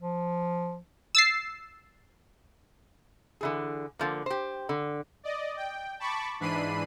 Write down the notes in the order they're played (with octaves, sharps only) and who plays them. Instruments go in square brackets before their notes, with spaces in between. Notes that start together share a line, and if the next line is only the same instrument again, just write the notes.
[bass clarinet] F3
[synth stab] E6 A6 C7
[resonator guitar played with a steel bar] D3 E3 G#4
D3 F3 A#3
G4 C5
D3
[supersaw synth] D5 D#5
G5
A5 B5 C#6 D6
G#2 E3 D4 B5 C7 D#7